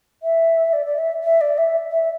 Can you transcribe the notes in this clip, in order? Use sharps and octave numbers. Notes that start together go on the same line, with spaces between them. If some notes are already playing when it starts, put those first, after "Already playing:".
E5
D5
D5
E5
E5
D5
E5
E5